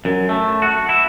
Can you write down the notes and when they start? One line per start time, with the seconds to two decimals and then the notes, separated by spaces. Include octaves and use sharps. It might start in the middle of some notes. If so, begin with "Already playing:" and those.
0.05 F#2
0.29 A3
0.62 F#4
0.89 E4